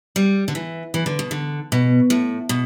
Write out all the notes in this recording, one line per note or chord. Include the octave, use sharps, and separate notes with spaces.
G3
D3
E3
E3
D3
B2
D3
B2
A2
B2